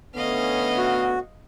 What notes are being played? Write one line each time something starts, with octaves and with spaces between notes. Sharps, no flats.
D3 A3 B3 C#4 D#5 F5
F#4